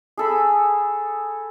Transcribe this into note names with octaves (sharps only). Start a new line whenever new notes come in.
G#4 A4 B5